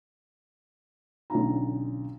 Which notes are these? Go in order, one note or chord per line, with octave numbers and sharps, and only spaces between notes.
B1 D3 C#4 F4 A#5